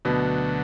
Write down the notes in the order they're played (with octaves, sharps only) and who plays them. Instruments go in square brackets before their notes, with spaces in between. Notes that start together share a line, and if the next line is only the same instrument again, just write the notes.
[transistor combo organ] D2 D3 F#3 A3 [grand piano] B2 B3